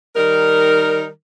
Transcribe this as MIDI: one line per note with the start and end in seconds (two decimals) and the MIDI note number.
0.16 1.07 51
0.16 1.07 55
0.16 1.07 63
0.16 1.07 70